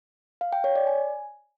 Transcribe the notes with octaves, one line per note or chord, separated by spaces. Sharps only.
F5
G5
C#5
D5
G#5